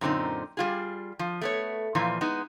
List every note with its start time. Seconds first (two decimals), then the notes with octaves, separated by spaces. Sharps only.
0.01 F#2 A#2 D3 A#3 C4 D#4
0.57 G3 F4 G#4
1.19 F3
1.41 A3 B3 C#5
1.95 A#2 E3 F3
2.21 G#3 B3 D#4